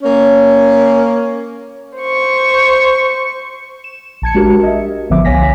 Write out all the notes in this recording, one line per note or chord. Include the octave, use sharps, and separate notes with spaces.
A#3 C#4
C5 C#6
E7
A#1 A5 G#6 C#7
G#3 D4 F#4 G4 A#4
D#5 E5
A1 D3 F3 B3 E5 D6
C2 C#5 F5 G#5 A#6 B6